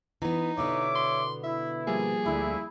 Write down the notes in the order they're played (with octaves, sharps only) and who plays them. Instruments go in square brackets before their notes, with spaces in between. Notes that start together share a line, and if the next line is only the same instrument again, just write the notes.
[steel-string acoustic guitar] E3 B3 [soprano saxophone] D#4
[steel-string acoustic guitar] B2 D3 B3 [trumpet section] C#5 E5 D6
[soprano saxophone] C6
[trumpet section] E4 [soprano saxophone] E5
[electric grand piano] F3 G3 A#3 [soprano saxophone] G#4
[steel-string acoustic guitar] D2 D3 [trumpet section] E4